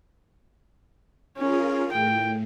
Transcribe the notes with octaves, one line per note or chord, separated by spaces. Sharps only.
C#4 F4 G#4 A#4
A2 G5